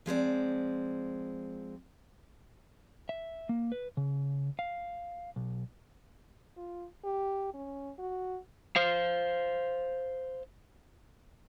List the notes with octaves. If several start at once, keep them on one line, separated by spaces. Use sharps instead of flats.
F3 G#3 C4 D5
E5
A#3
B4
C#3
F5
B1
F4
G4
C#4
F#4
C5 F5